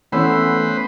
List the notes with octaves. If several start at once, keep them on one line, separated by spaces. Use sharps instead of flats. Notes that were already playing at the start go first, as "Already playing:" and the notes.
E3 A3 B3 C#4 B4 C5 F#5 E6